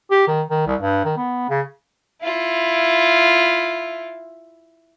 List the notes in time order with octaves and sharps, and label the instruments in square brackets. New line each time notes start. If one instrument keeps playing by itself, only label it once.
[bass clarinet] G4
D#3
D#3
C2
G2
D#3
B3
C#3
[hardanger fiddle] E4 F4